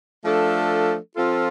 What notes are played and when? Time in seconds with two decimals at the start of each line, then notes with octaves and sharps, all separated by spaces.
0.24 F3 A3 D4 A4
1.15 F3 C4 F4 A4